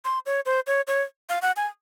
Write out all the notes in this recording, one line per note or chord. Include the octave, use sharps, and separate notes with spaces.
C6
C#5
C5
C#5
C#5
F5
F#5
G#5